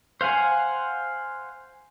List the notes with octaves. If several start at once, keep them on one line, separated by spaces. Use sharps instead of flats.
C5 F5 F#5 G#5